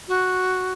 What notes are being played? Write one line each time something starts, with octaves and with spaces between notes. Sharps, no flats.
F#4